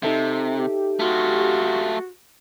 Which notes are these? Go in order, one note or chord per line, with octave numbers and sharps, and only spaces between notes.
C3 D#4 A4 E5
G4
A3 F4 F#4